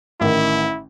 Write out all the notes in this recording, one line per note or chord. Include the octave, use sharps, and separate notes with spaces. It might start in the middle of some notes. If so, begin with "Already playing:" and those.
A1 D#3 E4